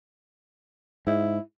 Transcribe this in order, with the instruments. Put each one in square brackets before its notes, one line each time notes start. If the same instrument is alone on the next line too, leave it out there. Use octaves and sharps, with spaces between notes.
[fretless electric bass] G#2 [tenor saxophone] E4